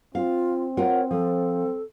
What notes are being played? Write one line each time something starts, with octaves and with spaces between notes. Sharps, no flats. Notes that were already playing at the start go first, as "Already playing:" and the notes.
C4 F4 F5
F4 A#4 C#5 F#5
F3 A4